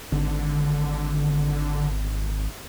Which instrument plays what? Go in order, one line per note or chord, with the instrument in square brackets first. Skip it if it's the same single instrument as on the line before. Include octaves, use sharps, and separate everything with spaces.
[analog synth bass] G#1 [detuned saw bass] D3